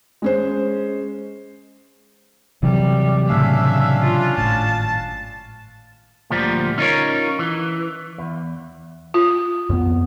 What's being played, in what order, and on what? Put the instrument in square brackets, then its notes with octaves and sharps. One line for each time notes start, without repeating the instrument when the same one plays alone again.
[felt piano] G#3 C#4 C5
[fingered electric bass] C3 E3 F#3 [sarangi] G3
[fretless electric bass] A2 C#3 A3 [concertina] C#4 D4 F5 [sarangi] E5
[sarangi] F4
[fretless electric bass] G#1 A2 [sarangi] A5
[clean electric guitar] D2 A#2 F3 G3
C#4 D#4 F4 A#4 C#5
E3
E2
[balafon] F4
[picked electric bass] F2 B3